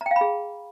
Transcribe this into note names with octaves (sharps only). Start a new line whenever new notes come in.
A#5
G5
F5
B5
G#4